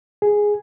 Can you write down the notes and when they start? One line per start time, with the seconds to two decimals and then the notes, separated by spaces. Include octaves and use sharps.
0.22 G#4